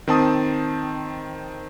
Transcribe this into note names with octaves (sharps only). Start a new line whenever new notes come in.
D#3 C4 A5 D#6